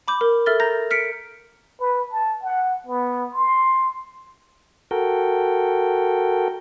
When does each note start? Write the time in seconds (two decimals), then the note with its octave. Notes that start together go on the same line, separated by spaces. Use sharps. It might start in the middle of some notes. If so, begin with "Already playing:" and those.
0.08 B5 D6 G6
0.21 A#4
0.46 A4 E5 F6 A6 G7
0.60 A#5 G6 A#6
0.91 F6 B6 C#7 D7
1.80 B4
2.11 A5
2.43 F#5
2.87 B3
3.34 C6
4.91 F#4 A4 A#4 G5